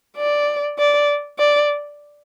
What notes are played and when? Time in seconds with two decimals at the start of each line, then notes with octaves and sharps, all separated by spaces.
0.17 D5
0.79 D5
1.39 D5